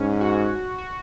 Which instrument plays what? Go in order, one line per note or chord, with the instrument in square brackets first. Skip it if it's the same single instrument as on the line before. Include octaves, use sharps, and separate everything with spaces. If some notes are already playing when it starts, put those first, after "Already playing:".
Already playing: [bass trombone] G#2 [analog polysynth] C#4
[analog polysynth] F#4
F#4